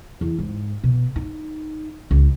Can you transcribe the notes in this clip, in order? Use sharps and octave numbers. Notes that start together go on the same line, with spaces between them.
E2
G#2
B2
D#4
C#2